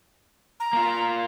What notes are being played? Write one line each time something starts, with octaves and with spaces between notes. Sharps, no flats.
A#5
A#3 F4